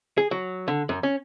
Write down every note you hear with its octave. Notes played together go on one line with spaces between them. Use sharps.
G#4
F#3
D3
F#2
C#4